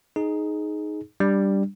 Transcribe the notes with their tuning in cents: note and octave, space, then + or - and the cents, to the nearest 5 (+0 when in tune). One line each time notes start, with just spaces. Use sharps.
D#4 +0 G#4 +15
G3 +0 D4 +0